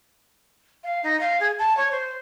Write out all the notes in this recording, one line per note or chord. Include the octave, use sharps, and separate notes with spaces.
F5
D#4
F5
G#4
A5
C#5
C5